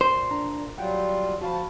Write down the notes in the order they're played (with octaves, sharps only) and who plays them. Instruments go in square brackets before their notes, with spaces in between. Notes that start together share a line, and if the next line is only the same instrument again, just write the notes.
[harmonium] A#2 [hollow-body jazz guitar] C5
[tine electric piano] D4 A#5
[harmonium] F#3 G3 F4 [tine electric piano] F#5 G5
[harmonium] F3 A5 [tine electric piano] F#4 F5 B5